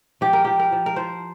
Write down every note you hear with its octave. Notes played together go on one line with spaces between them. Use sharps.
F3 G4
A#4
F3 G4
A#4
F3
A#4
F3 C5